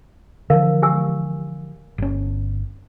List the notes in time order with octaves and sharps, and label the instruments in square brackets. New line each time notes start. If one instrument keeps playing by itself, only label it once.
[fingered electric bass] D3 E3 F3 [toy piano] A#4 F5
[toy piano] G4 G#5 E6
[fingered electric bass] G1 C#4